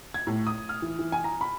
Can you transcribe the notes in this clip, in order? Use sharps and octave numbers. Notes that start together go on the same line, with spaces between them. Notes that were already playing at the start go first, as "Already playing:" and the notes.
G#6
A2
D#6
F6
E3
E3
G#5
A#5
B5